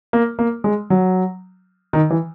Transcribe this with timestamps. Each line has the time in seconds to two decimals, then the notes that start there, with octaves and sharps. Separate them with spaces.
0.13 A#3
0.39 A#3
0.64 G#3
0.90 F#3
1.93 D#3
2.10 E3